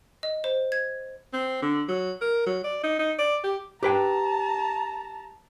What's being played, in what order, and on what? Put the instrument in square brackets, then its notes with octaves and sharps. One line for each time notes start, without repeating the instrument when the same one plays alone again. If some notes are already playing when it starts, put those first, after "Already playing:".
[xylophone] D#5
C5
G#6
[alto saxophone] C4
D3
F#3
A#4
F#3
D5
D#4
D#4
D5
G4
[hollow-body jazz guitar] G4 B4 G5 [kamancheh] A5 A#5